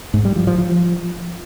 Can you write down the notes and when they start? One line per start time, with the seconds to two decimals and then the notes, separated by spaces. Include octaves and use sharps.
0.14 G#2
0.25 G3
0.36 F3
0.47 F3
0.58 F3